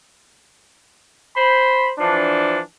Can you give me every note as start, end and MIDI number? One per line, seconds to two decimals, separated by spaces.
1.37 1.90 72
1.37 1.90 83
1.99 2.60 52
1.99 2.60 53
1.99 2.60 62